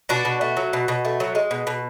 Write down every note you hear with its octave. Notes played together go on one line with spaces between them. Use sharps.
B2 D4 F#4
B2
A3
F#3
B2
B2
A3
F#3
G#3
B2
B2